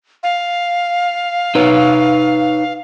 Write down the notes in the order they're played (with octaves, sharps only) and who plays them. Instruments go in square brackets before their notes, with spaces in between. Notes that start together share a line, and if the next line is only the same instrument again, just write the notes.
[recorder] F5
[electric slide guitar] D#4 B4 C#5